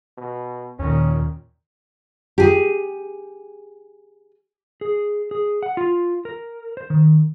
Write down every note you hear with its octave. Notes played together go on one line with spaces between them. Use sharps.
B2
D#2 A#2 D#3 C#4
G4 G#4
G#4
G#4
F#5
F4
A#4
C5
D#3